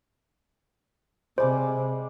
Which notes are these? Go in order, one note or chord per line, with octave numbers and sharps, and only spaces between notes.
C3 G3 G#3 C5 D6